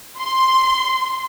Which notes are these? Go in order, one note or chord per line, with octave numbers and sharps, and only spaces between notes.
C6